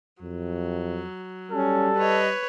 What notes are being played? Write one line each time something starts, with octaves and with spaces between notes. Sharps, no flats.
F2 F#3
G3 C#4 A4
B4 C#5 D#5